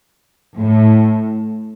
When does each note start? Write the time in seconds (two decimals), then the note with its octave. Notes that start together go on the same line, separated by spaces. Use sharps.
0.55 A2